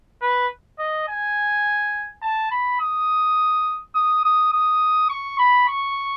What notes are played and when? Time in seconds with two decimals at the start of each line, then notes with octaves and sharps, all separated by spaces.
0.22 B4
0.79 D#5
1.08 G#5
2.22 A5
2.51 B5
2.80 D#6
3.95 D#6
4.24 D#6
4.53 D#6
5.09 C#6
5.39 B5
5.68 C#6